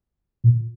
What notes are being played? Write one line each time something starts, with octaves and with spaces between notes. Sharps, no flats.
A#2